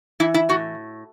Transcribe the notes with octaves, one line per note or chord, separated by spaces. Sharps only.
E3 E4
E4
A2 F#4